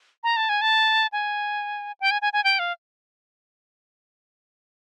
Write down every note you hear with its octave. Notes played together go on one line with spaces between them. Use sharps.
A#5
A5
G#5
A5
G#5
G5
G#5
G#5
G#5
G5
F5